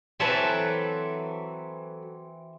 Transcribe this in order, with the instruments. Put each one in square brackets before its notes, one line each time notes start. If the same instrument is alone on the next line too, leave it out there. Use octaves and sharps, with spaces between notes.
[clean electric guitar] E3 C4 E5 [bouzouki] F#3 A4 B4